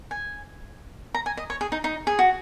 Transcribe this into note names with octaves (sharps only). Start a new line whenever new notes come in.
G#5
A#5
G#5
D#5
C#5
G#4
D#4
D#4
G#4
F#4